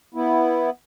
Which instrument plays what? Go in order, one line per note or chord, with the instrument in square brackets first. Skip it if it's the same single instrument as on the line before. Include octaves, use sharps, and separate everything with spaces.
[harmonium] B3 E4